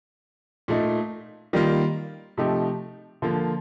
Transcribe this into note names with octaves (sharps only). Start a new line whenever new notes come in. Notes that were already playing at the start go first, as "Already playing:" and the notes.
A#2 A3 D#4
D#3 G3 A#3 F4
C3 F3 A3 D#4 G4
D3 F3 A#3 F4